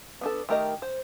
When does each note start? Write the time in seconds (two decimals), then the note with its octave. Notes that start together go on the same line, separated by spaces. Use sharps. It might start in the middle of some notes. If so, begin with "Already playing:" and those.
0.21 B3 D4 A4
0.49 D#3 A3 G4 A#4 D#5
0.82 C5